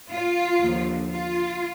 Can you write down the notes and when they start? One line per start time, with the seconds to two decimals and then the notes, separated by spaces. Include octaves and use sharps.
0.10 F4
0.60 D#2 D3 F3
1.10 F4